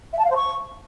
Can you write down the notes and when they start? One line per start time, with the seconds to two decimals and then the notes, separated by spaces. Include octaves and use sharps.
0.12 E5
0.18 A5
0.24 F5
0.30 C5
0.35 C#6